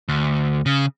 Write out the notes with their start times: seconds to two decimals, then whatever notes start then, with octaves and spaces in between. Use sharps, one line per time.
0.09 D2
0.66 C#3